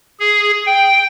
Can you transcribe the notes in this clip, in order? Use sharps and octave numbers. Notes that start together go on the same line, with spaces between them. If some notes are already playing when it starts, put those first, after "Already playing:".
G#4
G5